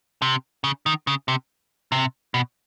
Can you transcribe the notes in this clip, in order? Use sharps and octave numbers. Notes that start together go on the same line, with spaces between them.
C3
C#3
D#3
C#3
C3
C3
B2